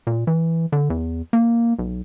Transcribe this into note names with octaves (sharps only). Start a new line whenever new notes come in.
A#2
E3
D3
E2
A#3
B1